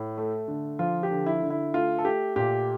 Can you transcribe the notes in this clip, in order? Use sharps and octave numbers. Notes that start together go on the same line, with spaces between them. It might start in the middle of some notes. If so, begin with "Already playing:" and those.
Already playing: A2
A3
D3
F3 F4
G4
D3
E4
D3
E4
A3 F4
A4
A3 G4
A#2 G4